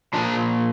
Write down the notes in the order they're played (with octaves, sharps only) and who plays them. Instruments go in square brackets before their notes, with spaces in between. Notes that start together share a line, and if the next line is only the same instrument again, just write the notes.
[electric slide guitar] A#2 F3 D4